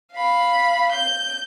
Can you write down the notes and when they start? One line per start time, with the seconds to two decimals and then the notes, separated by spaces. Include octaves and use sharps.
0.13 F5 B5
0.92 G6